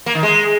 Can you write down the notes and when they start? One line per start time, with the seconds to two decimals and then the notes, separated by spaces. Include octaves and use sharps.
0.06 A#3
0.15 D#3
0.23 G#3